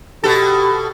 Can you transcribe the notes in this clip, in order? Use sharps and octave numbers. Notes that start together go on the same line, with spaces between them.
B2 G4 A4